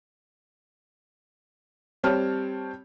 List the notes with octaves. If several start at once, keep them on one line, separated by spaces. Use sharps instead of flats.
G3 C4 C#5 A5 F6